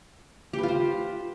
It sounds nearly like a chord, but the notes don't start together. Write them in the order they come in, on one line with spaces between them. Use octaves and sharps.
G4 B4 F4 C5